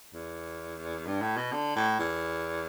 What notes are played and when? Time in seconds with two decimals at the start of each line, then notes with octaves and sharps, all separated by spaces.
0.14 E2
1.07 G2
1.22 A2
1.37 B2
1.52 D3
1.76 A2
1.99 E2